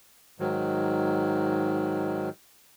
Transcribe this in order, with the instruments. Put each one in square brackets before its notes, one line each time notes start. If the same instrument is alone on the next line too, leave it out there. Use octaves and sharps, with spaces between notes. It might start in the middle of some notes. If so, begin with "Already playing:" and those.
[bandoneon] G#2 D#3 F#3